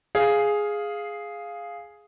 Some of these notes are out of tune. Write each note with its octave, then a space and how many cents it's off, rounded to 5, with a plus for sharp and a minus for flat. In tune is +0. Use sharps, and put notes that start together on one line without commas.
G#4 +0 F5 +0